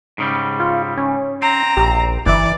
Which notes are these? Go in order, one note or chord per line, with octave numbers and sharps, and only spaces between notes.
G#2 C#3 G3
F4
C#4
C4 A#5
A#1 G4
G1 E3 D5 E5